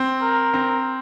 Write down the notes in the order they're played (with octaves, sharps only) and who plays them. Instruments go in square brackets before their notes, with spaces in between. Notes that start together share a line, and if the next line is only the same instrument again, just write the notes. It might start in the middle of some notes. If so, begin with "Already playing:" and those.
Already playing: [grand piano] C4
[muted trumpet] A#4
[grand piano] C4